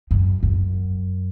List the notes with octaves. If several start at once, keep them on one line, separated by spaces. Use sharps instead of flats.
F#2
F#2